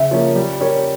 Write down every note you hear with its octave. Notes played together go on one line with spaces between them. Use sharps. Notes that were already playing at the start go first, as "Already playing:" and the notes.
Already playing: C#3 E5
F3 A#3 C#4
G3
C#4 G4 A#4 C#5